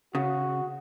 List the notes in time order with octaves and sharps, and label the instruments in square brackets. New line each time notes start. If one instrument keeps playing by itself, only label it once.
[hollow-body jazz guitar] C#3 [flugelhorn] F#4